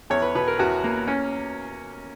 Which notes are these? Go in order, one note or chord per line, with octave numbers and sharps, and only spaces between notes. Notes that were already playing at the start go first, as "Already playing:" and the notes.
E2 C#5
B4
B2 B4
A#4
E2 F#4
A#3
C#4